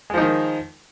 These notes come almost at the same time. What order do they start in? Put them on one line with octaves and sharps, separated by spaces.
G#3 F3 D#4 D#3